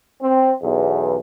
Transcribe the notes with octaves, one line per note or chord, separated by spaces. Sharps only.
C4
B1 E2